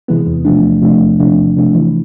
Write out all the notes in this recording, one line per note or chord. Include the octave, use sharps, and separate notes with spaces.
C3 E3 G#3 B3
E2
C3 F3 A3 D4
E2
C3 F3 A3 D4
E2
C3 F3 A3 D4
E2
C3 F3 A3 D4
E3